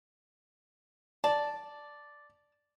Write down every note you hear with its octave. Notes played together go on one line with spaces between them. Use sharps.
D5 A5